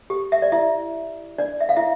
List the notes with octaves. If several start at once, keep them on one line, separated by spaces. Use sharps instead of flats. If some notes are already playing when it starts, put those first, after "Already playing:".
G4
E5
D5
E4 E5
D4 D5
E5
F5
E4 E5